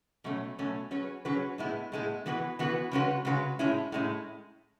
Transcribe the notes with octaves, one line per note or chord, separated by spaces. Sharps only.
B2 F#3 A3 C#4
B2 F#3 A3 C#4
F#3 C#4 G#4 B4
F#3 C#4 G#4 B4
A2 G#3 B3 E4
A2 G#3 B3 E4
E3 B3 F#4 B4
E3 B3 F#4 B4
C#3 G#3 C#4 F#4 B4
C#3 G#3 C#4 F#4 B4
A2 G#3 C#4 E4
A2 G#3 C#4 E4